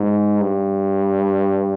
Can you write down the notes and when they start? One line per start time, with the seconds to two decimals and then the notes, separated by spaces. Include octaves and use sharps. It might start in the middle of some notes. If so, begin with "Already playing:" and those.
Already playing: G#2
0.41 G2